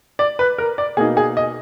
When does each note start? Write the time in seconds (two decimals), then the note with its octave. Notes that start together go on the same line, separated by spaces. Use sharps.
0.19 D5
0.39 B4
0.58 A#4
0.78 D5
0.97 B2 A#3 D#4 G#4
1.17 G#4
1.37 D#5